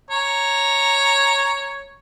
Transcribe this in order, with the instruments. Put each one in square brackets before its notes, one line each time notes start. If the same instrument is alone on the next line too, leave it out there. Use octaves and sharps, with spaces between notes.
[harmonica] C#5 A#5